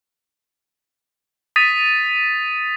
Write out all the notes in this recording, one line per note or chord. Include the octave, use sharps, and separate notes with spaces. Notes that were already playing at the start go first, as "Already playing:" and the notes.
D#6 A6 B6 D#7